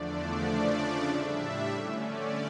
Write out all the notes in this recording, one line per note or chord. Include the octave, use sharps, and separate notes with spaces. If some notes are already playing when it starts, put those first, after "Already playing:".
Already playing: E2 D3 F3 A3 D4 D5
D5
C#3 F3 A3 D4 D5
D5
A2 G3 D4 E5
D3 A3 C#4
D5